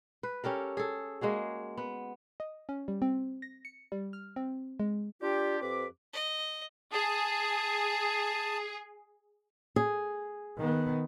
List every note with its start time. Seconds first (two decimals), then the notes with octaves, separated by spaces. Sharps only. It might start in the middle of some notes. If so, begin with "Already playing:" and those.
0.23 B4
0.44 C#4 G4 A4 A#4
0.77 G#4 A4
1.21 G#3 A#3 F#4 G#4
1.77 B3
2.40 D#5
2.69 C#4
2.88 G3
3.02 C4
3.42 A#6
3.65 C#7
3.92 G3
4.13 F6
4.36 C4
4.80 G#3
5.22 D4 F4 G4
5.61 F2 C4 G4 B4 D6
6.13 D#5
6.93 G#4 A5 D#6
9.76 G#4
10.58 D#3 B3